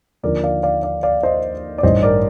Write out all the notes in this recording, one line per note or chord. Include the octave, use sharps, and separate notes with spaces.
D#2 D3 F3 A#4 D5
D5 F5
D5 F5
D5 F5
D5 F5
C5 D#5
D5
A1 G2 D#3 C5 D#5
A#4 D5